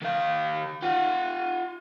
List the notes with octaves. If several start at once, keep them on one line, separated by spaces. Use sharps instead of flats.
D#3 F5
F4 F#5